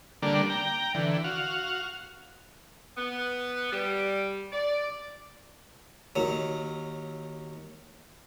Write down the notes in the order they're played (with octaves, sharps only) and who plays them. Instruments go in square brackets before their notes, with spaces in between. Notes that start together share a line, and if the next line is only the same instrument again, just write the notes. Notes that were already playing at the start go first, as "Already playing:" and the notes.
[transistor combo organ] D3 G3 A#3 D4
G5 A#5
D3 E3
F#4 F5
[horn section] B3
G3
D5
[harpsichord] D#2 F#3